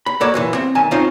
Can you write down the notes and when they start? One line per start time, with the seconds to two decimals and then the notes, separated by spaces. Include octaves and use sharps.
0.06 B5
0.21 A#3 F#4 A4 C#5 D5
0.34 F#2 A#2 E3
0.55 C4
0.75 B1 D#3 G#5 A5
0.91 C4 C#4 D#4 F4 C5 F5